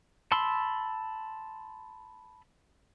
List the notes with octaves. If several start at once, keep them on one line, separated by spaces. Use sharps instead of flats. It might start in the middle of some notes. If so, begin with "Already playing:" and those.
A5 B5 C6 E6